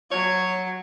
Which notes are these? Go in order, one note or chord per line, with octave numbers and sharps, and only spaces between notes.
F#3 C#5